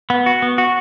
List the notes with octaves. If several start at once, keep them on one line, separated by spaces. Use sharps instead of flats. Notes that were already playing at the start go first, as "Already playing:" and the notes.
B3
F#4
B3
F#4